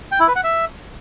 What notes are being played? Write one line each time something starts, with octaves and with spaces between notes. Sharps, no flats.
G5
E4
B4
F#5
E5